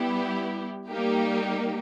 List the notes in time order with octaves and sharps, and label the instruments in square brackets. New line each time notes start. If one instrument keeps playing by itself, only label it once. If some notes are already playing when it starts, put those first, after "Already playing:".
Already playing: [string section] G3 B3 E4 G4
G3 A#3 D#4 G4